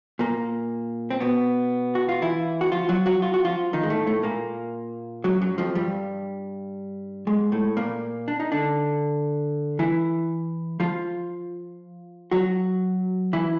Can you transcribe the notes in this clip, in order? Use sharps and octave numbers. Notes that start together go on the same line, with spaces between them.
A#2 A#3
C4
B2 B3
F#4
F4
E3 E4
F#4
F3 F4
F#3 F#4
F#3 F#4
F4
F#4
F3 F4
D#3 D#4
G#3
A2 A3
A2 A3
A#2 A#3
F#2 F#3
F#2 F#3
F2 F3
G2 G3
G#2 G#3
A2 A3
A#2 A#3
D4
D#4
D3 D4
E3 E4
F3 F4
F#3 F#4
E3 E4